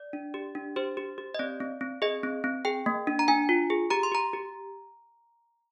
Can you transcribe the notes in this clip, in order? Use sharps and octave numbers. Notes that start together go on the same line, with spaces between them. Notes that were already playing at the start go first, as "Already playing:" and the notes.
Already playing: D5
D4
G4
D4
G4 C5
G4
G4
D#5
C4 D5
C4
C4
G#4 D#5
C4
C4
G#4 G5
A#3
D4
A#5
D4 G#5
F4
G#4
G4 A#5
C6
G4 A#5
G4